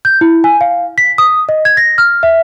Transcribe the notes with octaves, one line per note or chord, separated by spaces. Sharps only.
G6
E4
G#5
F5
B6
D#6
D#5
G#6
A#6
F6
E5